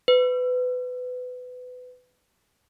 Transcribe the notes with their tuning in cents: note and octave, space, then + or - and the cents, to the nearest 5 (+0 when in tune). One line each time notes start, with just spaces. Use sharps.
B4 +25